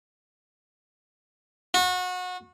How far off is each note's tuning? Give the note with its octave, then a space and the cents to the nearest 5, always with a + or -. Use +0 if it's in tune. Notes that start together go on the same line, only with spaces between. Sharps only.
F#4 -30